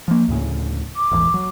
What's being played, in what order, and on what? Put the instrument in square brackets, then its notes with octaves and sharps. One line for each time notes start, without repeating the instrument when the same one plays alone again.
[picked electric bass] F3 A#3
D2 A2 C#3
[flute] D6
[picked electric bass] E1 A1
F#3